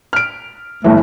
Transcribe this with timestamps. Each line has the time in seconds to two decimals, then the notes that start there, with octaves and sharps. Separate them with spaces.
0.13 F6 D7
0.84 G1 E3 A3